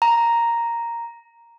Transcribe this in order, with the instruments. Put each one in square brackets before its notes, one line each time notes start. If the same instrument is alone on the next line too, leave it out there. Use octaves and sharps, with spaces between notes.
[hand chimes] A#5